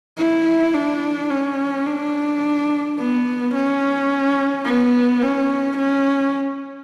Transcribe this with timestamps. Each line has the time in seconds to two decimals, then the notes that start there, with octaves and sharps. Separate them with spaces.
0.18 E4
0.74 D4
1.30 C#4
1.87 D4
2.99 B3
3.54 C#4
4.65 B3
5.22 C#4
5.78 C#4